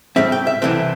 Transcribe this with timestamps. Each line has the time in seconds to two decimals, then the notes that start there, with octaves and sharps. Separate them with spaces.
0.16 A2 G3 C4 E5
0.32 G5
0.47 E5
0.62 C2 C3 E3 A3 C4